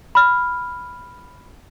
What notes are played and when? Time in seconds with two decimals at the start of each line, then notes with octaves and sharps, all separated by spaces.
0.15 B5 F6